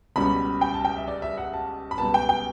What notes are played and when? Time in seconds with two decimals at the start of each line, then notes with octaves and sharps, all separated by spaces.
0.16 C#2 B2 G3 C#4 B5
0.61 G5
0.74 A5
0.85 G5
0.97 E5
1.08 D5
1.22 E5
1.37 F#5
1.53 A5
1.91 B5
1.98 C#2 B2 G3 B3 A5
2.14 G5
2.29 G5